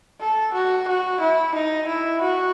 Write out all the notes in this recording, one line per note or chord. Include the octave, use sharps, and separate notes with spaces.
A4
F#4
F#4
E4
D#4
E4
F#4